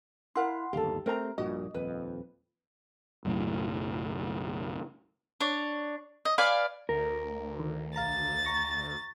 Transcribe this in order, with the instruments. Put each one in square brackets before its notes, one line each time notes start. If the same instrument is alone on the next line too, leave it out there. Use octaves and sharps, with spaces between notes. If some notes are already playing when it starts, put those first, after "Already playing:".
[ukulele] E4 A#4 F5 [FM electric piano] F#5 C6
[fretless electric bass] D1 G1 D#2 [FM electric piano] G4 [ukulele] A4 F5
[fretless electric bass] A3 C4 [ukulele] A#4 A#5
[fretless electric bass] A#1 G2 A#2 [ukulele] F#4 [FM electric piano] D#5
[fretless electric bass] D#1 F2 [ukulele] B4
[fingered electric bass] F#1 B1 F#2 A2
[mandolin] D4 C#5
D#5
B4 D5 F5 G#5
[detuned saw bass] D2 [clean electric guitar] A#4
[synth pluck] D#3
[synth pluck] B1 F5 A#5 [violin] A6
[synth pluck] A#5 C#6 A#6